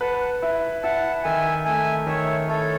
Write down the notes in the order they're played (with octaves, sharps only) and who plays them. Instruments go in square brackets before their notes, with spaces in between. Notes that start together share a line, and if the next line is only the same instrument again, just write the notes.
[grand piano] B4 [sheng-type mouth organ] F#5 A5
[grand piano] E4
[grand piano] E4 [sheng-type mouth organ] F#5 A5
[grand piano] D#3 [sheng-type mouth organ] E5 G#5
[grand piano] A3 [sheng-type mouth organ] E5 G#5
[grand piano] D#3 [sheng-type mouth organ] C#5 E5
[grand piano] E4 [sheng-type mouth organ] A4 C#5